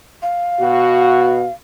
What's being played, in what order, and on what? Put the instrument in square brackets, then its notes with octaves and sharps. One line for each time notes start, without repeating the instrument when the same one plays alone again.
[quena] F5
[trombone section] B2 F#4